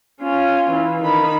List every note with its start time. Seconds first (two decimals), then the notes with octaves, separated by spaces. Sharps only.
0.22 C#4 F4
0.71 E3
1.04 D#3 B5